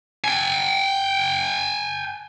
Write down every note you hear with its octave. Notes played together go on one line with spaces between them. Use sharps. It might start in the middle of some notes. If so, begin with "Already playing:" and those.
G5 G#5